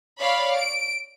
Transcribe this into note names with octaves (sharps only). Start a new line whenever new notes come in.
C#5 D5 F5 B5
D7